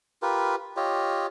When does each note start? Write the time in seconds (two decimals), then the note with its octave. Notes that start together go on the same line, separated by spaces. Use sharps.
0.22 F4 G4 A#4 B4
0.77 F4 G4 C#5 D#5